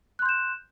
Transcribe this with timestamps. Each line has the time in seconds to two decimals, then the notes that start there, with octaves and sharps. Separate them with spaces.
0.19 F#6
0.22 C6
0.26 G6
0.29 E7